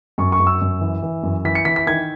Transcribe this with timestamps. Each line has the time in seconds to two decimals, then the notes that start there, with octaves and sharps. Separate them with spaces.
0.18 F#2 C#6
0.32 C#6
0.40 F#2
0.47 E6
0.61 F#2
0.81 E3
1.02 E3
1.23 F#2
1.45 E3 B6
1.55 C#7
1.65 E3 B6
1.76 B6
1.87 D#3 G#6